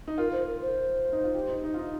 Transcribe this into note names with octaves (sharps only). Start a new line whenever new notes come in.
D#4
F4 A#4
C5
A#4
C5
D#4
F4
G4
D#4
D#4
F4
D#4